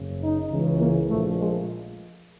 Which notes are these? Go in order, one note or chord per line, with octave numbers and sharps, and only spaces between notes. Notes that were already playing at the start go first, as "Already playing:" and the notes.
Already playing: F#1 F#2 C#3
D#4
C#2 C#3 E3
A#3
A#1 A#2 F3 A3
G#3